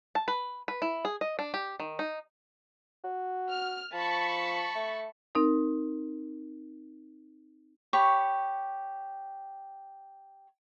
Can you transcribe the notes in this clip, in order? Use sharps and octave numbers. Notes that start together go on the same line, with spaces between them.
A5
B4
B4
E4
G#4
D#5
D4
G4
D#3
D#4
F#4
F6
F3 A5 B5 C#6
A3
C4 D#4 A#4
G4 C#5 B5 C#6